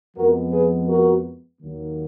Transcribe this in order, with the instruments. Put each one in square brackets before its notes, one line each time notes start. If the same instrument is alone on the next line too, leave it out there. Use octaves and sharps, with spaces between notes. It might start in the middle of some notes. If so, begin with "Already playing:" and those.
[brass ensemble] F2 F3 G#3 B3 F#4 A#4
G#4 B4
F#4 A#4
D#2 D#3 F#3 A#3